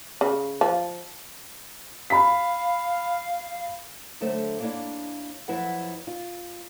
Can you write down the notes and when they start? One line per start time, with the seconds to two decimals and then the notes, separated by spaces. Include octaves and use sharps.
0.21 C#3
0.61 F3
2.10 F5 B5 B6
4.21 D3 F#3 A3 A4 C5
4.60 A#3 D4 E4 C#5 D5 F5
5.48 F2 F3 F#3 E4 B4 F#5
6.07 F4